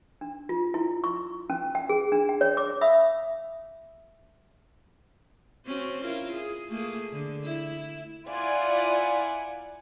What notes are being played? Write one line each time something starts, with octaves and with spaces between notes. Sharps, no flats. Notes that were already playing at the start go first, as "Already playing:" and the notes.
D4
F4
E4
C#6
C#4
G5
G#4
D4
G5
C#5
D6
E5 F5 B5 D#6 E6
C4 C#4 F#4
E4 F4 A#4
G#4
A3 A#3 G#4
D3
E4
E4 F4 D5 F#5 G#5